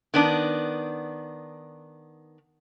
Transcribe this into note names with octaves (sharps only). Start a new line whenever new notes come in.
D#3 B3 D4